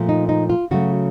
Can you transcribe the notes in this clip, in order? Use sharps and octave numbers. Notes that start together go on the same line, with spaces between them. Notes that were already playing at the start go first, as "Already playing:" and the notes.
Already playing: A#2 F3 A3
D#4
D#4
F4
C#3 F#3 A3 F#4